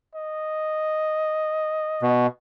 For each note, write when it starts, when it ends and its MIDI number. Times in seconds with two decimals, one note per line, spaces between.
0.15 2.29 75
2.02 2.27 47